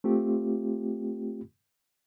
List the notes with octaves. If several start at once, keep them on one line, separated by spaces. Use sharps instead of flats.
A3 C4 F4 G4